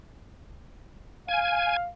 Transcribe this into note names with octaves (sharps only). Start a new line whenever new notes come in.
F5 G#5